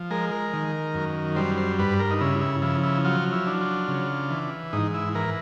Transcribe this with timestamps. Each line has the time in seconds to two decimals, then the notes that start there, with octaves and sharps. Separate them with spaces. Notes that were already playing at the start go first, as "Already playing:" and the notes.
Already playing: F3
0.11 G#3 A#4
0.31 A#4
0.53 D#3
0.94 F#2
1.36 G3 C5
1.58 C5
1.79 G2 B4
1.99 A#4
2.11 D#4
2.21 C#3 E4
2.41 E4
2.62 F3 E4
2.83 E4
3.05 F#3 F4
3.33 E4
3.47 D4
3.61 F4
3.88 C#3
4.31 E3
4.73 G#2 D#4
4.94 E4
5.15 E3 A#4